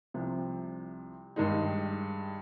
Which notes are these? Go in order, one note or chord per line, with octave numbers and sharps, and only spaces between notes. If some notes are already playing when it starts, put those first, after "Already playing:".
C2 C3 F3
G2 D#3 G#3 D#4